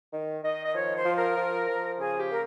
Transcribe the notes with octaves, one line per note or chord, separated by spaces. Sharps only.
D#3
D#3 D#5
D#5
F3 C#5
C5
F3
A#4
F3
F3
C#3 G#4
G4
A#3 A#4